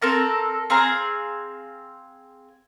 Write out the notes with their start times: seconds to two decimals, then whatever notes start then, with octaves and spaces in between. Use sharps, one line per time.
0.02 C4 A4 A#4 A5
0.70 C4 G#4 F5 A#5